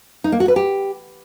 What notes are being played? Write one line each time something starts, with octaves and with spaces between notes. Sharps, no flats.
D#4
A#3
F#4
B4
G4